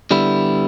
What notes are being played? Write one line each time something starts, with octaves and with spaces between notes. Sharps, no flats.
D3 G3 B3 E4